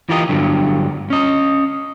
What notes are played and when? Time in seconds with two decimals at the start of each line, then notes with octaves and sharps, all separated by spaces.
0.09 E3 F4 G4 A#4 B4 D#5
0.29 G2 D3 F#3
1.10 C#4 D#5